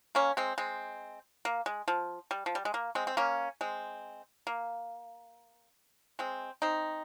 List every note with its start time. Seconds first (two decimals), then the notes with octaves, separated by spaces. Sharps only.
0.15 A#3 C#4
0.37 G#3 C4
0.58 G#3 C4
1.45 A#3
1.66 G#3
1.88 F3
2.31 G3
2.46 F3
2.55 G3
2.65 G#3
2.74 A#3
2.95 G#3 C4
3.07 C4
3.17 A#3 C#4
3.61 G#3 C4
4.47 A#3
6.19 G#3 C4
6.62 C4 D#4